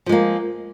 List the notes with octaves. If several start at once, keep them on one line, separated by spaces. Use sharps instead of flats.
F3 G#3 A#3